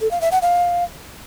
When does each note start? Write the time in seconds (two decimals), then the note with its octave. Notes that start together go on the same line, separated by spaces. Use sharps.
0.01 A4
0.11 F5
0.21 E5
0.32 F#5
0.42 F5